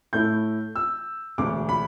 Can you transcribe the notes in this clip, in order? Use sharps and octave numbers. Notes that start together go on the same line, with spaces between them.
A2 A3 E4 G6
E6
E1 D2 D3 D6
B5